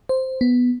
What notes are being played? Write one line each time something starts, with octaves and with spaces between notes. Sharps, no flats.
C5
B3